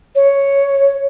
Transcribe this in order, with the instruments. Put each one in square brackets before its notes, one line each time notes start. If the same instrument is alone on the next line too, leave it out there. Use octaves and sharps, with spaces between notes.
[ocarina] C#5